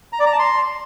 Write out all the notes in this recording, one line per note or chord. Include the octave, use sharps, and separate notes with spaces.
A#5
D5
A#5
A5
C6